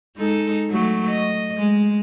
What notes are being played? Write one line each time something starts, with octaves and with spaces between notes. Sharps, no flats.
G#3 D#4 A4
F#3 A3
D#5
G#3